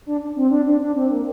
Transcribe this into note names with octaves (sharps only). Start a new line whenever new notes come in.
D4
C4
D4
D4
D4
C4
A#3